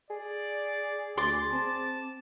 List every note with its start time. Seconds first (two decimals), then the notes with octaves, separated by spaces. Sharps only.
0.10 G#4 D5
1.17 D2 D5 C6
1.52 C4 A5